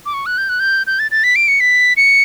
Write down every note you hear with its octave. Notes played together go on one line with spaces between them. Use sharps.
D6
C#6
F#6
G6
F#6
G6
G6
A6
A6
B6
D7
C#7
B6
C#7